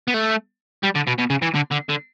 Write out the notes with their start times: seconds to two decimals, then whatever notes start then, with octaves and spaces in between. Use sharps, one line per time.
0.08 B3
0.14 A3
0.84 G3
0.96 D3
1.07 B2
1.19 B2
1.30 C#3
1.42 E3
1.54 D3
1.71 D3
1.89 D3